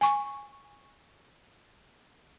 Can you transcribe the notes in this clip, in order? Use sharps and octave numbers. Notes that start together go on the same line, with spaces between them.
G#5 C#6